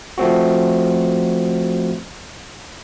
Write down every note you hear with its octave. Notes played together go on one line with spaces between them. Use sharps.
F3 A3 C4 F#4